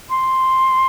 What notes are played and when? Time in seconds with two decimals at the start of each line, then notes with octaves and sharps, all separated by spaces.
0.10 C6